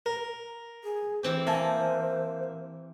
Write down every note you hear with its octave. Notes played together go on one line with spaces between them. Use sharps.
A#4
G#4
E3 C4 G4 C5
A#3 E5 G#5 A5